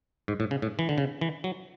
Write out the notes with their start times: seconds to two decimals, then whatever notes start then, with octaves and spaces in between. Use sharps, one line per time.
0.28 G#2
0.40 A2
0.51 C#3
0.62 A2
0.79 E3
0.89 D3
0.98 C#3
1.21 E3
1.44 F#3